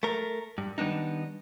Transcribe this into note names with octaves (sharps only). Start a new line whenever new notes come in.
A3 A#4
G2
D#3 G3 B3 D4 D#4